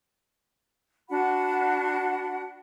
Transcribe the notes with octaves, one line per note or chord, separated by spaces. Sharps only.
D4 F#4 F#5 B5